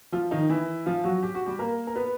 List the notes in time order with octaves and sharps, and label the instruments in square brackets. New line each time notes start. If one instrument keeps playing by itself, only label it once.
[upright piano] F3 F4
D#3 D#4
E3 E4
F3 F4
F#3 F#4
G4
F#4
G3 G4
A#3 A#4
A#4
B3 B4